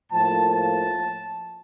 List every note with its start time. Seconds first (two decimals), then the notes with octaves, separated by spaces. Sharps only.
0.11 A2 F3 A#3 A5
0.52 A5